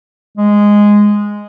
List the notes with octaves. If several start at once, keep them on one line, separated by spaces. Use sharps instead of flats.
G#3